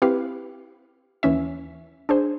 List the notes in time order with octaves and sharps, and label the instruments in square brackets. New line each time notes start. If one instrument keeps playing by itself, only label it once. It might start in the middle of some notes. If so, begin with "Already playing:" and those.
[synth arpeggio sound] C4 E4 G4 B4 F5
D#2 E3 C#4 E5
D4 G#4 C5